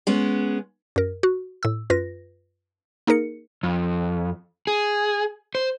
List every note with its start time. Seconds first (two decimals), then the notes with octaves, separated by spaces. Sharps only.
0.07 G#3 B3 C#4
0.96 F#2 A#4
1.23 F#4
1.63 A2 E6
1.90 F#2 F4 B4 A#6
3.07 A#3 D#4 G#4 A#4 C#7
3.63 F2
4.67 G#4
5.55 C5